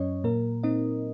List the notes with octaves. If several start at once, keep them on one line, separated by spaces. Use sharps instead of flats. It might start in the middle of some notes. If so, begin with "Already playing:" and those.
Already playing: F#2 F#3 C#4 C#5 D#5
A#2 A#3 A#4
C4 D#4 D#5